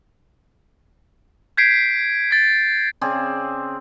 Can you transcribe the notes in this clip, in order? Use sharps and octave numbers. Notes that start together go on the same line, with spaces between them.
G6 G#6 B6 C7 D7
A6 B6
C#3 C4 G#4 D5